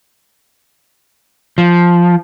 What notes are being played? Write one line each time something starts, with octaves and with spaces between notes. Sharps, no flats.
F3